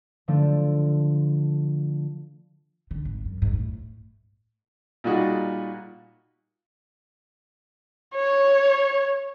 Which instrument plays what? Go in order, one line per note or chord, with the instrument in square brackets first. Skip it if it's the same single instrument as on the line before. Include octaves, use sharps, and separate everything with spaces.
[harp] D3 F3 A3 D4
[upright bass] D3
G#1
F#2
G#2
A2
[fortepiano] A#2 G3 D#4 F#4 G#4
[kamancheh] C#5